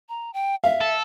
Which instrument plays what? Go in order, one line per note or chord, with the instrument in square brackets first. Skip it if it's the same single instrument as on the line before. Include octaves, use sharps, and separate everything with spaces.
[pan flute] A#5
G5
[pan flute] E5 [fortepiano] F5
[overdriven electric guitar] A4